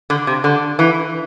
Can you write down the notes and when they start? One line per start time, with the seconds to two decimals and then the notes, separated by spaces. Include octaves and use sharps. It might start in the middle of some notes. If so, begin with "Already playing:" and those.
0.10 D3
0.27 C3
0.44 D3
0.79 E3